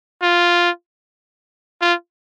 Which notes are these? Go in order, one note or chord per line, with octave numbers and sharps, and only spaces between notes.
F4
F4